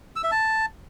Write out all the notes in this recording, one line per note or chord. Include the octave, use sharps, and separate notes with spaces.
E6
E5
A5